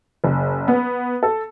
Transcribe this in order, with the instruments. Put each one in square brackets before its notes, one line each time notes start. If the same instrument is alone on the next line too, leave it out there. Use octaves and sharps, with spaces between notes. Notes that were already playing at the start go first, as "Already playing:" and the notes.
[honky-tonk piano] F#1
B3
A4